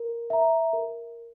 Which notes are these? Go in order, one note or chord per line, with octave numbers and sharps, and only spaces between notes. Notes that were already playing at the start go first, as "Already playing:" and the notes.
Already playing: A#4
E5 A#5
A#4